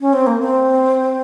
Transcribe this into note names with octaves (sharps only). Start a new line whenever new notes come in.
C#4
C4
A#3
C4